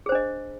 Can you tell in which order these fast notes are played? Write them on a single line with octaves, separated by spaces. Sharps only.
G#4 C5 D4 D#5